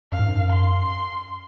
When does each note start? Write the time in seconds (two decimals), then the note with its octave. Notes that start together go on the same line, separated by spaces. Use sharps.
0.12 F#2 F5
0.19 G#2
0.27 F#2
0.52 C6